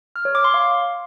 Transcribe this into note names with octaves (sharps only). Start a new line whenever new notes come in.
F6
C#5
D6
C6
F5